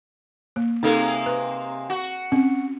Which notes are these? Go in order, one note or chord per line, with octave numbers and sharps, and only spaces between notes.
A#3
C3 G#3 A#3 D#4 A4
B4
F#4
C4 C#4